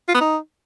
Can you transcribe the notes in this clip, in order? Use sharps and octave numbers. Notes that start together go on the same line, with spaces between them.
F4
B3
D#4